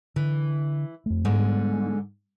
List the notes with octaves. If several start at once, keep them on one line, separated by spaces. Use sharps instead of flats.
D3 E3
F2 A3
G#2 D3 G3 B3